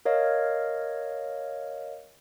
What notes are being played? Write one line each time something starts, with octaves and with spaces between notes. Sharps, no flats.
A#4 C#5 D#5 F5